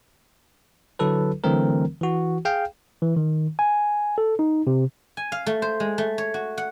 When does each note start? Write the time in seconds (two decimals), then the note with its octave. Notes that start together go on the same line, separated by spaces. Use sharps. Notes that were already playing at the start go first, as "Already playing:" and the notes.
0.99 D3 F#3 E4 A4 B4
1.44 D3 E3 F#3 A3 C4 A#4
2.01 E3 F#4
2.45 G#4 F5 G5
3.02 E3
3.16 D#3
3.59 G#5
4.18 A4
4.39 D#4
4.67 C3
5.17 G#5
5.32 F5
5.46 A3
5.62 C5
5.80 G#3
5.98 A3
6.18 C#5
6.34 F#4
6.58 F#5